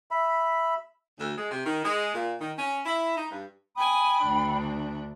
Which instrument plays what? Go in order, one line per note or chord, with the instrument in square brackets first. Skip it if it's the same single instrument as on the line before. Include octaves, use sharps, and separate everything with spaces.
[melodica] E5 B5
[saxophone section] D2
G#3
C3
D#3
G#3
A#2
D#3
C#4
E4
D#4
G2
[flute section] G5 B5 [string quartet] G#5 D#6
[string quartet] D2 D4